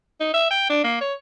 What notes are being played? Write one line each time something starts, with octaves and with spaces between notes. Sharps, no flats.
D#4
E5
G5
D4
A#3
C#5